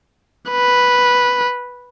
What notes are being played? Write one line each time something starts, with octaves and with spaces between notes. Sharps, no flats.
B4